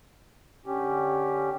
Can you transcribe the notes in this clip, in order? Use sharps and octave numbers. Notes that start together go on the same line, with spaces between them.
D3 C#4 G4